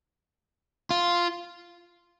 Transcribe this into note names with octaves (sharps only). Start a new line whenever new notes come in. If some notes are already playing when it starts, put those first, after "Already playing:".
F4